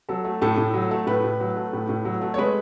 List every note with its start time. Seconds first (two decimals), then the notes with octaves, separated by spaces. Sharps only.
0.09 F#3 A4
0.24 A3
0.42 A2 A4
0.57 A2
0.74 F#3
0.91 A3
1.07 A2 B4
1.24 A2
1.40 F#3
1.57 A3
1.73 A2
1.89 A2
2.05 F#3
2.21 A3
2.34 C#5
2.38 G#3 B4